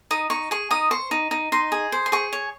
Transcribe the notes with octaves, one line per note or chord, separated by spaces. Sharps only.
D#4 D#6
D#4 C#6
G#4 C#6
D#4 D#6
C5 C#6
D#4
D#4
D#4 C6
G#4
C5
C6
G#4 C#6
C#5